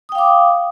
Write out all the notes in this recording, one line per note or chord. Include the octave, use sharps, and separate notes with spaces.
F5 G5 D6 D#6